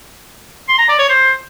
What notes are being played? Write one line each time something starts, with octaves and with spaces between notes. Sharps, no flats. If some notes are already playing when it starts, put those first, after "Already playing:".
C6
A#5
D5
C#5
C5